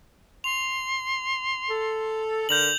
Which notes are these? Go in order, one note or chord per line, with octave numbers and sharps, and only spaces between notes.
C6 F7
A4
D3 A#4 G6 F7 F#7